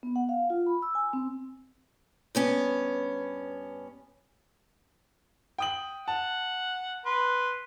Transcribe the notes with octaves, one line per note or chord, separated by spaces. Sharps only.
B3
F#5
F5
F4
B5
E6
G#5
C4
G2 B3 C#4
G5 D#6 F#7
F#5 A5
B4 C6